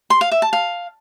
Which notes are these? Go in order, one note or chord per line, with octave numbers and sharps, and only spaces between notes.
C6
F5
E5
A5
F5